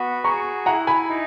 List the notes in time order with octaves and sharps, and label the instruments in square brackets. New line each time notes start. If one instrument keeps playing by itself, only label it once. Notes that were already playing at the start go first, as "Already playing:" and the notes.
Already playing: [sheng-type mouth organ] B3 F#4
[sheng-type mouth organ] G#4 [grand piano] A#5 C#6
[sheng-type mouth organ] E4 [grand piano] F#5 A#5
[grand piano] G#5 B5
[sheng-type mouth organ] D#4